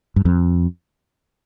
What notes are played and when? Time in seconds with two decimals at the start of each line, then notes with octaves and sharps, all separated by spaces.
0.16 G2
0.25 F2